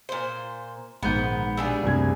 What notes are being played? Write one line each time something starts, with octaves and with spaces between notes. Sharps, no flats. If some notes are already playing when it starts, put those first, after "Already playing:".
A#2 C5
A#1 G#2 D#3 G#3 B3 G6
B2 G3 D4 G#4 E6
C2 F#2 A3 D4 G#6